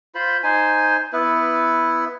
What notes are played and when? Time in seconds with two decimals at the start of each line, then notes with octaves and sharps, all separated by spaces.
0.15 F4 C5 B5
0.43 D#4 C5 G#5
1.13 B3 E4 B4